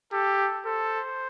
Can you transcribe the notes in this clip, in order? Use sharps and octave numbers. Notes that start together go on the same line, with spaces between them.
G4 A4
A4 C5